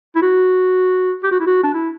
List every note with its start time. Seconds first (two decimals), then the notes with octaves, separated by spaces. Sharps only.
0.15 E4
0.22 F#4
1.24 G4
1.31 F#4
1.40 E4
1.47 F#4
1.63 D4
1.74 E4